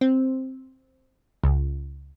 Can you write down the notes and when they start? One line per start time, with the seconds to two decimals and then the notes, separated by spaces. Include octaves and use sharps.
0.01 C4
1.43 C#2